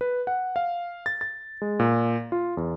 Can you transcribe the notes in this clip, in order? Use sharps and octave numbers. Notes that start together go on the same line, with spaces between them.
B4
F#5
F5
A6
A6
G#3
A#2
F4
E2